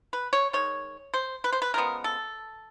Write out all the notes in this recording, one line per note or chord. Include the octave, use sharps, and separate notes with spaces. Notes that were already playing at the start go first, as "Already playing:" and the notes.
B4
C#5
D#3 G#3 C#5
C5
B4
C5
B4
C#3 F3 G#3 B3 A#4
A4